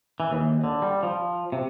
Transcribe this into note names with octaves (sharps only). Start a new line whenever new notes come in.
E3
D#2
D3
G3
F3
C3